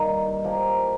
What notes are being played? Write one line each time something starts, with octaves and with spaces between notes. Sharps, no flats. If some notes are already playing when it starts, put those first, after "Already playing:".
Already playing: G2 D#3 A#3 D#4
F3 A#3 G4